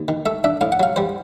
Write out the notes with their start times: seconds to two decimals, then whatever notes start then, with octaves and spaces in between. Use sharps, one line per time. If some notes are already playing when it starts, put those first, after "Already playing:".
Already playing: D#2
0.08 D#3
0.26 A3 E5
0.44 D4 E5
0.61 A2 F5
0.72 F#5
0.80 F#3 F5
0.96 G3 C5